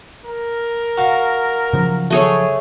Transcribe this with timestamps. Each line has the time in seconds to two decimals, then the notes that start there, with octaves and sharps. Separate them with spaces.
0.25 A#4
0.98 F#4 F5
1.73 C#3 F3 F#3
2.10 A3 G#4 C#5